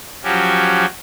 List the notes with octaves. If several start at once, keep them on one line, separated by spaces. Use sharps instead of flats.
F3 F#3 C#4 F#4 G4